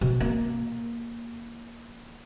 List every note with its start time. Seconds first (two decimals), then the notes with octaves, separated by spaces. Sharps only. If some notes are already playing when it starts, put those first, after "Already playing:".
0.01 B2
0.20 A#3